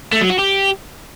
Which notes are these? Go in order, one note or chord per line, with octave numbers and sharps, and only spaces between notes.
A3
F#3
F#4
G4